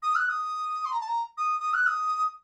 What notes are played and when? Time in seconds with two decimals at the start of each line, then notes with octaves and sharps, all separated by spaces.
0.03 D#6
0.16 F#6
0.29 D#6
0.85 C6
0.92 A#5
1.01 A5
1.08 A#5
1.38 D#6
1.60 D#6
1.74 F#6
1.87 D#6